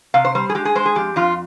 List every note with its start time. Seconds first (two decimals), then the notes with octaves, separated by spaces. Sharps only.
0.14 C3 F5
0.25 C5
0.35 G3 C5
0.49 G#4
0.55 G#3 G4
0.65 G#4
0.75 G#3 C5
0.85 G#4
0.95 F2 G4
1.16 F2 F4